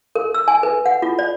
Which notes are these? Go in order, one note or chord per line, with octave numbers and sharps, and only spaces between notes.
A#4
E6
G#5
B4
F#5
F4
D5